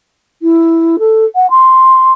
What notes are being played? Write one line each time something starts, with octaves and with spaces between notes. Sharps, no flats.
E4
A4
F#5
C6